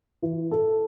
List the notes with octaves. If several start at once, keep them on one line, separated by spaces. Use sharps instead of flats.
E3
A4